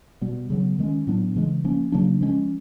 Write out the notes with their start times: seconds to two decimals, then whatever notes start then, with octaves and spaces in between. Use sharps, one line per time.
0.21 B2 G3 B3
0.50 C#3 F#3 B3
0.79 D#3 G#3 C#4
1.07 A2 F#3 B3 D4
1.36 C#3 E3 G#3
1.64 F3 A#3 C#4
1.92 C#3 F#3 A#3 D4
2.21 F3 G#3 C#4